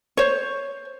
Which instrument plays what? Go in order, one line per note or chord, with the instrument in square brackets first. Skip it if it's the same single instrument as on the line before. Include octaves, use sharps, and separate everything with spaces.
[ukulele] C5 C#5